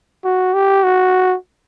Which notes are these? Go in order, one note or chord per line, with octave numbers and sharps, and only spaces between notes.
F#4
G4
F#4